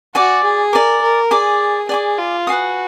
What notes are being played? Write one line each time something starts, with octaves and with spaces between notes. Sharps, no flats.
F#4 D5 G#5 D6
G#4
A#4 D5 G#5 D6
A#4
G#4 D5 G#5 D6
G#4 D5 G#5 D6
F4
F#4 B4 F5 G#5 D#6